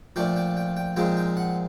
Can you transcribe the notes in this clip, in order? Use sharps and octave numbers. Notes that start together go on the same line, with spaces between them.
A#2 F3 A3 D4 G5
G5
G5
G5
A#2 F3 G#3 C4 D#4 G5
G5
F#5